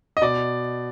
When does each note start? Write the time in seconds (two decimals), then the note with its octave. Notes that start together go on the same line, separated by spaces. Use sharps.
0.17 D#5
0.22 B2 D5